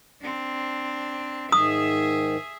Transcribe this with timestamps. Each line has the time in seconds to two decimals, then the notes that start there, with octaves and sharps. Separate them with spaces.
0.22 C4 D4
1.52 G#2 D#3 G#4 E5 D#6